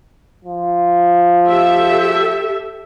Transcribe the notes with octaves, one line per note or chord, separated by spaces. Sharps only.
F3
G4 A4 E5